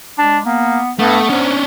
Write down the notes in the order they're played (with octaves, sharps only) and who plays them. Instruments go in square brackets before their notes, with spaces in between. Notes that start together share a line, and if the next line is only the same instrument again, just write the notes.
[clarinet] G#3 [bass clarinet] D4
[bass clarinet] A#3 [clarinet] B3
[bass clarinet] G2 [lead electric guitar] A3 [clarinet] B3
[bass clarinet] G#2 [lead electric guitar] C#4 D4